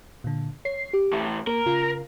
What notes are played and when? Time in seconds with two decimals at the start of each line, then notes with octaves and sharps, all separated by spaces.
0.24 A#2 D3
0.65 C#5 C7
0.93 G4
1.13 A2 E3
1.47 A#3 A#4
1.66 C#3 F4